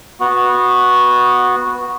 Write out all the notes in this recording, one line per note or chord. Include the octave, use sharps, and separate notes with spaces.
B3 F#4